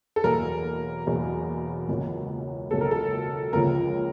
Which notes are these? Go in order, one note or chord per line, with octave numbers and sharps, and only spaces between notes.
A4
E2 B2 F#3 A#3 A#4
E2 B2 F#3 A#3
C#2 B2 F#3 A#3 C#4
C#2 B2 F#3 A#3 C#4 A4
A#4
A4
C#2 C#3 F3 A#3 A#4